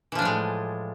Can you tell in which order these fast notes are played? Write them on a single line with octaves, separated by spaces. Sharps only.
E3 F3 D4 A2 G#3